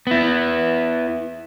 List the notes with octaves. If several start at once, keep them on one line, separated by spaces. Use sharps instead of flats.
B3 E4